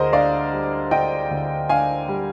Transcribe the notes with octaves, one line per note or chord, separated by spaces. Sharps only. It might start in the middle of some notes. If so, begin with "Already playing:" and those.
Already playing: D2 D3 G#4 A#4 C5 D#5
D4 D5 F5
G3
D3 D#5 G5
D2
D4 F5 G#5
G3